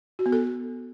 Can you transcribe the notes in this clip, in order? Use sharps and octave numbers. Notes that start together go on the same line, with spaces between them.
F#4
B3
A4